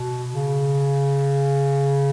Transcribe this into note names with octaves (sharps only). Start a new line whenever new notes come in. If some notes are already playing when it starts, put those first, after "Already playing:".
Already playing: B2
C#3